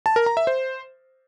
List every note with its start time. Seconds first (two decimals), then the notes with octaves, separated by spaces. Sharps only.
0.06 A5
0.16 A#4
0.26 A#5
0.37 E5
0.47 C5